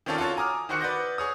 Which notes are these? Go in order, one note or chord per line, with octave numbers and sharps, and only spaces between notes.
D#3 C4 C#4 F4 A4 D5
F4 F#4 A4 C#5
G#5 A#5 D6 D#6 F6
D#3 F#4 C5 C#6 F#6 C#7
B4 D5 F#5 F#6 G6 A#6
G#4 C#5 D#6